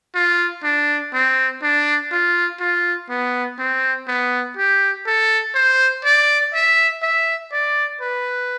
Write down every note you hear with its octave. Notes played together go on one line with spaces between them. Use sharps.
F4
D4
C4
D4
F4
F4
B3
C4
B3
G4
A4
C5
D5
E5
E5
D5
B4